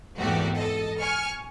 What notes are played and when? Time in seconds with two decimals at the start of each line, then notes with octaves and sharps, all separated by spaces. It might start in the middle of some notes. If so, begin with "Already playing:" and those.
0.17 G#1 E2 G#2 A3 F#4 G4
0.59 A4 D#5
1.01 G#5 C#6 F6